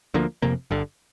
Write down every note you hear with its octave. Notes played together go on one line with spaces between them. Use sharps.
D2 D3 F3 A#3
F1 F2 C3 A#3
G1 G2 D3